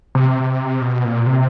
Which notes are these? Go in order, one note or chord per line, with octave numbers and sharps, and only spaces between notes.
C3
B2
A#2
C3